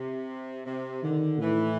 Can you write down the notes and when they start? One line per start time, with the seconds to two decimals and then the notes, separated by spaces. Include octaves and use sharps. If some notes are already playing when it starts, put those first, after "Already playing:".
Already playing: C3
0.65 C3
1.03 D3 D#3
1.40 A2 E3